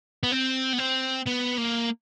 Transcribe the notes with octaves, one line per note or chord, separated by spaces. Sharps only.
B3
C4
B3
C4
B3
A#3